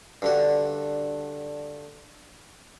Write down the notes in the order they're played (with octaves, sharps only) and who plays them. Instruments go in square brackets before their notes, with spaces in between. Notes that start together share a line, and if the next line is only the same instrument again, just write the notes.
[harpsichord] G2 D3 F#4